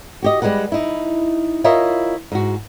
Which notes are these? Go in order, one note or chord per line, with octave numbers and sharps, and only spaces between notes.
F#4 G4 D#5
G3 G#3 A4 B4 F#5
D#4 E4
E4 F4 A#4 C#5 D#5 E5
G#2 F#4